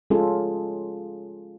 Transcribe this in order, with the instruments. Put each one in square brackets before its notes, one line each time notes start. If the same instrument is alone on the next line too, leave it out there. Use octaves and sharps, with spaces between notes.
[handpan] G#3 C#4 F4 G#4 A4